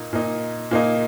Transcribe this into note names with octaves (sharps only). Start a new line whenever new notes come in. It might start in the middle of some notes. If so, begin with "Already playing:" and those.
Already playing: A#2 A#3 D#4
A#2 A#3 D#4
A#2 A#3 D#4